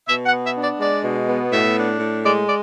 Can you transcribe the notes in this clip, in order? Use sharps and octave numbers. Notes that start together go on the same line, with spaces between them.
B2 E5
F#5
B3
E5
D4
D5
G#3 D5
B2
B3
A2 E5
D4
A2
G#3 D5
D5